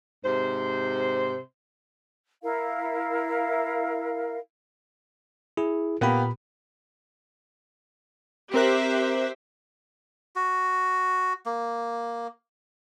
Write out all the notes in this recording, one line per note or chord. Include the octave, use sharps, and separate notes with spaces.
G#2 C3 C5
E4 A#4 F5
E4 G#4
A#2 A#3 B3 G4 B5
C4 G4 A#4 C5 E5 F#6
F#4
A#3